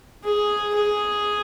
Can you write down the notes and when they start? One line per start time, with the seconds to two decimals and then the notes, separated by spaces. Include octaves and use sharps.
0.24 G#4
0.75 G#4